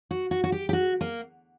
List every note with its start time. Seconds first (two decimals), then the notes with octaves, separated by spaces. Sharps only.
0.11 F#4
0.31 F#4
0.44 F#4
0.52 G4
0.69 G4
0.73 F#4
1.01 A#3